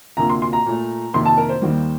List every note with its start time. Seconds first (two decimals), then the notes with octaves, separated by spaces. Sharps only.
0.17 D2 C3 F3 A#3 A#5
0.30 C6
0.42 C6
0.53 A#5
0.66 A#2 A3
1.13 F2 C3 D#3 A#3 C6
1.25 A5
1.38 A#4
1.49 C5
1.62 D#2 D#3 G3 A#3